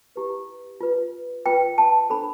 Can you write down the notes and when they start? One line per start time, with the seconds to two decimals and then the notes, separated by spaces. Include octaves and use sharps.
0.16 E4 G4 B4
0.81 F4 B4
1.46 F4 B4 G5
1.78 A5
2.10 D4 A4 C5 B5